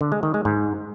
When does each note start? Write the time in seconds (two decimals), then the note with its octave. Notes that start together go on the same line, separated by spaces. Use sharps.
0.01 D3
0.12 G#3
0.23 D#3
0.34 G#3
0.45 G#2